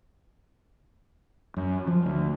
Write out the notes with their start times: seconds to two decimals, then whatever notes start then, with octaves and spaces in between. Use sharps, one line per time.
1.57 F#2
1.87 F3
2.06 D2